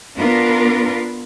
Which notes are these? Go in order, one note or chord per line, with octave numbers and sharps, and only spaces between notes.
B3 D4 F4 A#4 B4